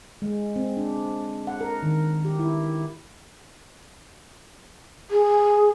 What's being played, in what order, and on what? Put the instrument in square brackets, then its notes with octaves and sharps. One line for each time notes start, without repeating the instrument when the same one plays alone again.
[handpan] G#3
C4
D4
F#5
A#4
D#3
G4
E4
[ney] G#4